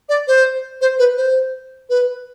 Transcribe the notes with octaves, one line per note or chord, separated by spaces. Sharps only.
D5
C5
C5
B4
C5
B4